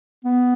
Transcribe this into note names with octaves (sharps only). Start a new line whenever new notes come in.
B3